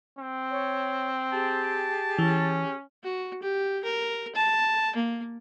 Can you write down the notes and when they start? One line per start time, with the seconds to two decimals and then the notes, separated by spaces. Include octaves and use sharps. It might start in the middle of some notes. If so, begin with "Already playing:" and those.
0.19 C4
0.51 C#5
1.33 G4 G#4 A5
2.18 E3 C#4
3.03 F#4
3.42 G4
3.84 A#4
4.35 A5
4.95 A#3